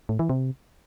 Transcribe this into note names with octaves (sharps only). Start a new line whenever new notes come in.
A2
E3
C3